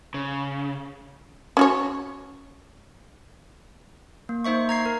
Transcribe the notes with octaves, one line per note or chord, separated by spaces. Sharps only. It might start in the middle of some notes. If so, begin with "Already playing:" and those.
C#3
C#4 F#4 C#5
A#3
A#3 D#4 C5 E5 C#6
A#5 G#6 C7
A#4